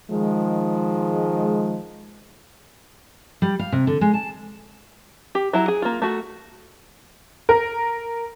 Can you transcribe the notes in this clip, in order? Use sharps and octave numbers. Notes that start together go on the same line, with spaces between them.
D#3 F3 G#3
G3
F5
C3
D3
G#3
A5
G4
F#3 E4 A#5
G#4
A#3 F4
A3 F#4
A#4